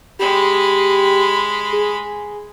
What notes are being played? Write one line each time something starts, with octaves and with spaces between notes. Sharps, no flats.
G#3 G4 B5
G#4